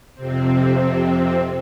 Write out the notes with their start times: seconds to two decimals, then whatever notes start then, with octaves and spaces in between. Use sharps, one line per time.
0.15 F2 C3 C4